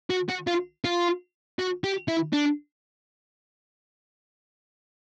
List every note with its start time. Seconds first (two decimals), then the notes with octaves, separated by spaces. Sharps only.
0.10 F#4
0.29 F#4
0.47 F4
0.85 F4
1.59 F#4
1.84 G4
2.08 E4
2.33 D4